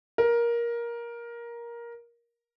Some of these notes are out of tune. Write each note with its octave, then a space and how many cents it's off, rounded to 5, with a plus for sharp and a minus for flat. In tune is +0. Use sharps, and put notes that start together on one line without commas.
A#4 +15